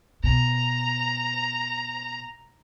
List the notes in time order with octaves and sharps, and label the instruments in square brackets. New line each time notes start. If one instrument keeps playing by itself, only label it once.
[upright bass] B2 [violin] A#5